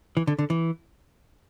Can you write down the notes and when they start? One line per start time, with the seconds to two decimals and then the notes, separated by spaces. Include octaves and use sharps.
0.17 E3
0.27 D3
0.39 D3
0.50 E3